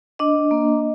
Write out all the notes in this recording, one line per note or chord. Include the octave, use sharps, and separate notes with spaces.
D4 D#5
A#3